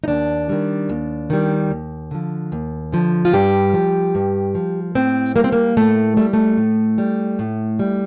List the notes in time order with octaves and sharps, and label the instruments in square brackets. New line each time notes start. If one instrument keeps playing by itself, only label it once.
[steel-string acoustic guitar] D#4
D#2 D4
D#3 G3
D#2
D#3 G3
D#2
D3 F3
D#2
D3 F3
F4
G2 G4
F3
G2
F3
A2 C4
G3 A#3
C4
A#3
A2 A3
G3 A3
A3
A2
G3
A2
G3